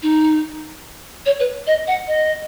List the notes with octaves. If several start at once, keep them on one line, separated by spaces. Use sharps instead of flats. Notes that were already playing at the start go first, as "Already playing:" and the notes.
D#4
C#5
B4
D#5
F#5
D#5